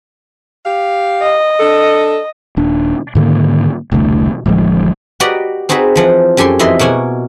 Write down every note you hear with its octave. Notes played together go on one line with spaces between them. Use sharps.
G4 F5
D#5
D4 A4
D#1 D4
G#2 D3 D#3 A#3
E1 C2 D3 A3
D1 A1 F3 G#3
F#4 G4 B4 D5 D#5 A#5
C4 D#4 F#4 G#4 B4
E3 F3 F#5
F#2 G4 A4 G#5 C6
F2 E3 E4 D#5 E5 C6
B2 A#3 C#5 F#5 G#5